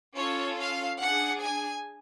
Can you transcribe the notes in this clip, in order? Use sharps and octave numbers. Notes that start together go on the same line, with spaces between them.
C#4 F4 A4 C#5
F5
D4 G#4 F#5
G#5